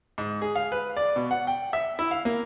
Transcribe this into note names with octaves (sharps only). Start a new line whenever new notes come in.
G#2
G#4
F5
B4
D5
B2
F#5
G5
E5
E4
F5
A#3